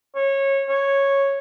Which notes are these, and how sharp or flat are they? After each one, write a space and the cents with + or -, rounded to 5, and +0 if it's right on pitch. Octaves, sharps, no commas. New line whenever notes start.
C#5 -20
C#5 -5